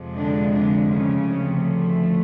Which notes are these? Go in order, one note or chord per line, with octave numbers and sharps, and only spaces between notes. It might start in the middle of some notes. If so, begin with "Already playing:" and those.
Already playing: F2 C3 F3 G#3
D3 D4
D3 D4
C#3 C#4
D2 C3 F3 A3